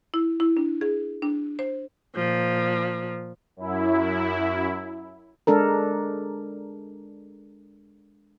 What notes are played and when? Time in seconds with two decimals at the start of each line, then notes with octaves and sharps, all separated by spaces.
0.14 E4
0.40 E4
0.57 D4
0.81 G#4
1.22 D4
1.59 C5
2.15 A#2 F3
3.57 F#2 E4
5.47 G#3 D4 A4 A#4